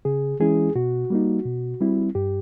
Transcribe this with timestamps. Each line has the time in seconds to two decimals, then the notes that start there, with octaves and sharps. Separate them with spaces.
0.05 C#3 G#4
0.40 E3 G#3 C#4 E4 G#4
0.76 B2 F#4
1.10 G3 A#3 D#4
1.45 B2
1.80 G3 C4 E4
2.15 G2 G4